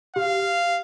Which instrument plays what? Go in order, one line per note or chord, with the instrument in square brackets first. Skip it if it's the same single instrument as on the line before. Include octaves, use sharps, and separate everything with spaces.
[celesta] G4 [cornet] F5